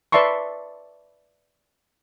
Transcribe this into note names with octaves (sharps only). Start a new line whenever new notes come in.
B4 D5 E5 A5 C6 C#6